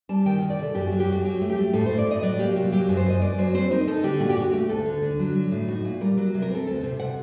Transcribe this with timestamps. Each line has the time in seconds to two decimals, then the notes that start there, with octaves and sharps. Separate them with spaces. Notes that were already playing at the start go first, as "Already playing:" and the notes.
0.09 G3 A5
0.26 D#3 G5
0.38 D#3 F#5
0.50 D5
0.59 C3 A4
0.75 F#2 G4
0.87 F#3 F#4
1.00 G4
1.08 F#2 F#4
1.24 F#3 G4
1.41 A3
1.49 G4
1.57 A3
1.73 A2 A4
1.86 A2 C5
1.98 D5
2.07 A2 D#5
2.22 F#3 D5
2.39 A#3 G4
2.56 C3 F#4
2.72 F#3 G4
2.89 F#2
2.97 C5
3.06 F#2 D#5
3.22 F#2 D5
3.38 F#3 C5
3.54 C4 C5
3.71 D#4 A#4
3.87 D#4 A4
4.03 D3 G4
4.20 A#2 F#4
4.29 G4
4.37 A#2 F#4
4.53 A3 G4
4.69 D2 A4
4.86 D3
5.02 D3
5.19 F#3
5.35 F#3
5.51 A2
5.68 D#4 F#4
5.85 A#2
6.01 G3 A#4
6.17 F#3 A#4
6.34 C3
6.42 A#4
6.50 C4 A4
6.67 D2 A4
6.83 C3 C5
7.00 C3 F#5